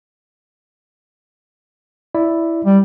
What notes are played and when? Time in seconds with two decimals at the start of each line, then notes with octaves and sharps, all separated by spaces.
2.15 E4 D5
2.66 G3